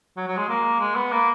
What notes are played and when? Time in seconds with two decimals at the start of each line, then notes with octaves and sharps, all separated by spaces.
0.17 F#3
0.27 F#3
0.37 G#3
0.49 A#3
0.80 G#3
0.95 B3
1.12 A#3